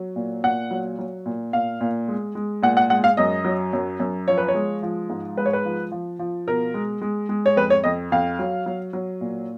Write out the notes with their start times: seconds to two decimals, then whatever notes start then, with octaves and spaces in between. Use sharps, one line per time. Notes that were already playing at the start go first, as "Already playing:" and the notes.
Already playing: F#3
0.16 A#2
0.44 A#2 F#5
0.71 F#3
0.99 F#3
1.26 A#2
1.53 A#2 F5
1.81 A#2
2.08 G#3
2.35 G#3
2.62 A#2 F#5
2.77 F#5
2.90 G#3 F#5
3.04 F5
3.17 F#2 D#5
3.45 F#3
3.73 F#2
4.00 F#2
4.28 F3 C#5
4.38 B4
4.48 C#5
4.55 G#3
4.83 F3
5.10 G#2
5.37 G#3 B4
5.46 C#5
5.53 B4
5.65 F3
5.92 F3
6.19 F3
6.47 B2 A#4
6.74 G#3
7.02 G#3
7.29 G#3
7.46 C#5
7.56 F2 B4
7.70 C#5
7.84 F2 D#5
8.12 F2 F5
8.39 F#3
8.66 F#3
8.93 F#3
9.21 A#2